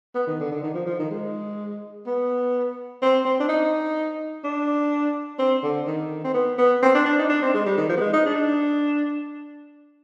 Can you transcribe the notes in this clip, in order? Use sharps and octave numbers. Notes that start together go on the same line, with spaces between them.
B3
D#3
D3
D3
D#3
F3
F3
D#3
G#3
B3
C4
C4
D4
D#4
D4
C4
D3
D#3
C4
B3
B3
C4
D4
D4
D#4
D4
C4
G#3
G3
D#3
F3
B3
G#3
D#4
D4